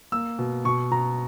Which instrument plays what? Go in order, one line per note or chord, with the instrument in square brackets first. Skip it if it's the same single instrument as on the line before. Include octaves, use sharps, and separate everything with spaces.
[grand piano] A#3 E6
B2
B2 C#6
B2 A#5